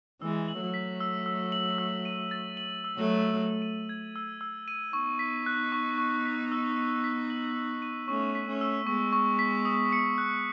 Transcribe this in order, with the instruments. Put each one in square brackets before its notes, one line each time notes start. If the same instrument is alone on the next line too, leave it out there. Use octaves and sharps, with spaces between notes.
[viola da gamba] E3 G#3 [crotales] E6
[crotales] F#7
[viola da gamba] F#3 A3
[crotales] B6
E6
E6
F#7
E6
D#7
A6
F#7
E6
[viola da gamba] F#3 A3
[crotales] D#7
E6
D#7
G#6
E6
E6
D#7
[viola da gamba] B3 D#4 [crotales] C#6
[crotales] B6
F#6
C#6
C#6
B6
E6
D#7
B6
F#7
E6
D#7
[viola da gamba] A3 C#4 [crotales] C#6
[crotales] B6
[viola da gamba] A3 C#4
[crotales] E6
[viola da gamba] G#3 B3 [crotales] C#6
[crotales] C#6
B6
D#6
C#7
F#6